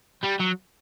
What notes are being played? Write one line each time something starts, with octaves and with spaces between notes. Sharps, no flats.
G3
F#3